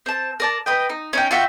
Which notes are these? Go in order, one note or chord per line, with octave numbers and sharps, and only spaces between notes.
C4 A5
A#4 D5 A5
B4 D#5 G5
D#4
C#4 D#4 G5
F4 F#4 E5 G5